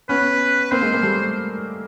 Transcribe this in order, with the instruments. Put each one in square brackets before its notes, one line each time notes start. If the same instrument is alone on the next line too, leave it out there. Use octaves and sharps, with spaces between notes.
[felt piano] B3 C#4 [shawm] B4
[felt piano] A#3 C4 [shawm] C5
[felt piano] G#3 A#3
G#3 A#3
G3 A3